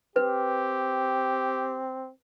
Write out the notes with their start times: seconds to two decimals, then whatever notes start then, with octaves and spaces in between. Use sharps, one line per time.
0.16 C4 G4 B4